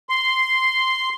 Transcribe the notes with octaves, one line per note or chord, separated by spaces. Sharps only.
C6